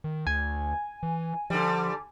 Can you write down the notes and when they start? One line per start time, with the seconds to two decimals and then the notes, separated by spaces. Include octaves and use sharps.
0.04 D#3
0.27 D2 G#5
1.03 E3
1.50 D3 F3 G3